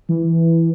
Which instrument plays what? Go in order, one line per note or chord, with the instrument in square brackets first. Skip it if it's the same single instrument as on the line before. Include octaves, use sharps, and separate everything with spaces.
[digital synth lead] E3